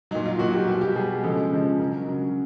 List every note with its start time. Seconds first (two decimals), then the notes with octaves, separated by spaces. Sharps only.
0.11 F#3 D#4
0.15 A#2
0.25 F4
0.39 A#2 F#3 F#4
0.53 G4
0.67 B2 G3 F#4
0.81 G4
0.96 B2 G3 G#4
1.23 C#3 F3 G#3 A4
1.51 C#3 F3 G#3
1.79 C#3 F#3 A#4
2.07 C#3 F#3